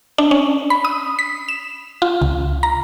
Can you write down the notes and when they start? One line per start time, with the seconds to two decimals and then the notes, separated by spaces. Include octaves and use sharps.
0.18 D4
0.31 C#4
0.70 B5
0.85 D#6
1.19 B6
1.49 E7
2.02 F4
2.22 C#2
2.63 A#5